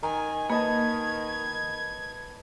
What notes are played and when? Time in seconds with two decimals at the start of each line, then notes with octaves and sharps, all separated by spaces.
0.03 D#3 G#5 A#5
0.50 A#3 B4 D#5 A5 G#6